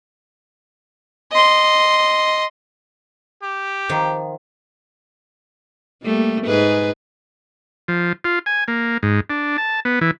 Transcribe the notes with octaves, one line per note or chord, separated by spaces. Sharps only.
D#5 C6
G4
D#3 F3
G3 A3 A#3
G#2 G#4 B4
F3
F4
G#5
A#3
G#2
D4
A5
B3
E3